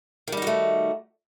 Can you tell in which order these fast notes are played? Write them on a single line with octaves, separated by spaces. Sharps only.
D#3 G3 D#4 F#4 A3